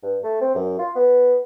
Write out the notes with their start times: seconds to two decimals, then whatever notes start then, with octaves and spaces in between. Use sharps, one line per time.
0.03 G2
0.24 A3
0.41 C4
0.55 F#2
0.79 F4
0.96 B3